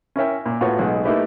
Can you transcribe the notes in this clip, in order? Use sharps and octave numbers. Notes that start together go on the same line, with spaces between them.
C#4 E4 A#4 C#5 E5 G5
A#2
A2 B3 F4 F#4 C#5
B1 B2 G#3 B4 F#5
A3 A#3 D#4 E4 G4 B4